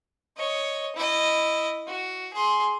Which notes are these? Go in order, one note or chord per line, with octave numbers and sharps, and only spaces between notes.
C#5 D#5
E4 D#5
F#4
G#4 C6